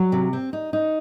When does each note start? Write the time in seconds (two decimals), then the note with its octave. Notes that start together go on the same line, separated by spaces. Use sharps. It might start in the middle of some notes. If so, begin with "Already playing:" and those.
Already playing: F#3
0.12 C3
0.33 C4
0.53 D#4
0.73 D#4